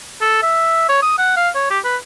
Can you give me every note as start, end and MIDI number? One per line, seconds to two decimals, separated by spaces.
0.22 0.41 69
0.43 0.88 76
0.89 0.99 73
1.02 1.14 87
1.18 1.36 78
1.36 1.49 77
1.55 1.66 73
1.71 1.80 67
1.85 1.96 71